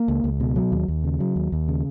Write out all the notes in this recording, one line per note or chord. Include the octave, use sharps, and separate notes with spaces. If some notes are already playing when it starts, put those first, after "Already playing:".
Already playing: A#3
C#2
C#2
B2
F#3
D#2
D#2
C#3
F#3
D#2
D#2
C#3